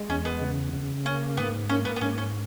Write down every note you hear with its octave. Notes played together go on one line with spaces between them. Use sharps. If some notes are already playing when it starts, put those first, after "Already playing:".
Already playing: G#3
E2 C#4
B3
C#3
C#3
A#3 C#4
G#2 B3
A#3 C#4
B3
B3
G#2 C#4
C#4